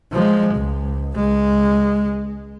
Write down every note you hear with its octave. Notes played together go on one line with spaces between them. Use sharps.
F3 G#3
C#2
C#2 G#3